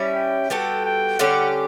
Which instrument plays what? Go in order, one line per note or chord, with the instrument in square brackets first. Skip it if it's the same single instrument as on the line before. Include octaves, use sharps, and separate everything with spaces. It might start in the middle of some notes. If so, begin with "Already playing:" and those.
Already playing: [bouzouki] G3 C#4 E4
[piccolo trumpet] G5
[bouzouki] G3 B3 F#4 A4 [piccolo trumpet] G5
[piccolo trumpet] G5
[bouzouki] D3 G3 C#4 G4 [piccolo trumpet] F#5